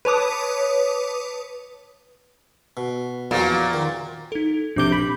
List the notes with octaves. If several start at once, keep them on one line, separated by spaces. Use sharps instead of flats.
B4 C#5 A5 D6 D#6
B2
E2 A#2 F3 F#3
D#3
D#4 A4
A#1 C3 D4 D6 G6 D7
B5